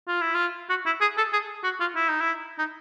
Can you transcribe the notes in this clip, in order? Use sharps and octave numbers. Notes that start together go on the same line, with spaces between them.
F4
E4
F4
F#4
E4
G#4
A4
G#4
F#4
F4
E4
D#4
E4
D#4